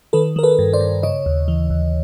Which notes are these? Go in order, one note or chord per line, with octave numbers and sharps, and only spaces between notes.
D#3 A4 B4
D#3 A#4
A4 B4
G2
C5 D5
G2
C#3 C#5 D#5
D#2
E3
D#2